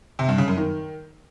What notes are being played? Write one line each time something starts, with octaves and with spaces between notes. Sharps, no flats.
C3
G2
C#3
F#2
D#3